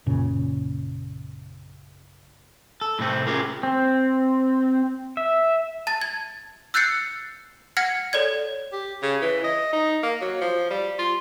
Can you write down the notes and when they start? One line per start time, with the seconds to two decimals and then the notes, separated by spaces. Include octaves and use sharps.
0.06 A#1 F#2 A#2 C#3
2.81 A4
2.99 A2 C3 A3 C4
3.27 C#4 F4 G4 G#4 A#4
3.63 C4
5.17 E5
5.87 A5 A6
6.01 G#6
6.74 E6 F#6 G6 A6 C7 C#7
7.77 F#5 F6 G#6 A#6 C#7
8.13 A4 C#5 D5 G#6
8.72 G4
9.02 C#3
9.22 E3
9.44 D#5
9.73 D#4
10.03 A#3
10.21 F#3
10.41 F3
10.71 G3
10.99 F4